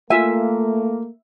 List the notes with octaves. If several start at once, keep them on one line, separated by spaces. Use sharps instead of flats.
A3 A#3 F4 E5 G#5